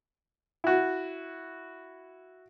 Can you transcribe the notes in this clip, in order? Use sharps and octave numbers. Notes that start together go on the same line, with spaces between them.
E4 F#4